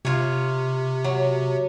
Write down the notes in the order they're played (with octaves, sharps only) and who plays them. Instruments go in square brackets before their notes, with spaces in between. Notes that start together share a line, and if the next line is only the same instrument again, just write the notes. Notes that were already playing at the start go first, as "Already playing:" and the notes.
[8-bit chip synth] C3 [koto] F4 C#5
[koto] F#3